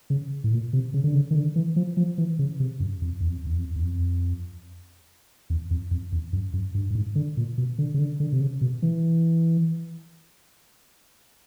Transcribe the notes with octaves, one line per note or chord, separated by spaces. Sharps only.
C#3
A2
A#2
C3
C#3
D3
C#3
D#3
D3
E3
F3
F3
E3
C#3
C3
F#2
F2
E2
F2
E2
F2
E2
F2
E2
F2
F2
E2
F#2
F#2
G2
G2
G#2
D3
A#2
B2
D3
C#3
D3
D3
C3
C#3
B2
E3